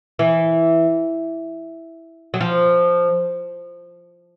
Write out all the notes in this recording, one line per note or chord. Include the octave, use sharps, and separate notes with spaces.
E3
F#3
F3